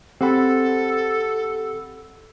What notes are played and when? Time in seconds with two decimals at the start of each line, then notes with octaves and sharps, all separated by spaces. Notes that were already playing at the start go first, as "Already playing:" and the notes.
0.21 C4 G4 A4 F#5 B5